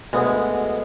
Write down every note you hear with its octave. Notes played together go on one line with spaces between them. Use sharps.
D2 G#3 B3